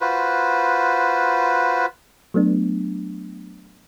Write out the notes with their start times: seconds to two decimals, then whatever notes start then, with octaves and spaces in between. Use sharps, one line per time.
0.01 F4 F#4 B4 C5
2.34 F#3 A3 B3 D4